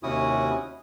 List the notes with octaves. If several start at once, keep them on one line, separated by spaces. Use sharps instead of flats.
D#2 C3 C#4 E4 F#4 D#6